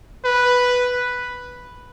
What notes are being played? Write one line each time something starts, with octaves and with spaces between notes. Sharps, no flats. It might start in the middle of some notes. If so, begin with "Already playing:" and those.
B4